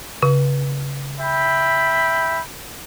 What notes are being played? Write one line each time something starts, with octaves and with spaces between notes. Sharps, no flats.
C#3
E5 G5 B5